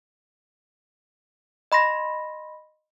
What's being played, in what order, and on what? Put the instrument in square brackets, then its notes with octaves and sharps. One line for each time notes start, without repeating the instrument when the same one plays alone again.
[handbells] D#5 B5 C6 A#6